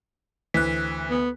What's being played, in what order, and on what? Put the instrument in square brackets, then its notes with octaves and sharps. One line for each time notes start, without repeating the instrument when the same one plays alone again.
[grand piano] D2 C5 [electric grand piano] E3 [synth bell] F#6 B6
[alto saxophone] B3